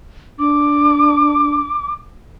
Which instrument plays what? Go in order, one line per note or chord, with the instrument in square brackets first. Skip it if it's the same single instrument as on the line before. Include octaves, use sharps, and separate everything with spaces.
[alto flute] D4 [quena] D6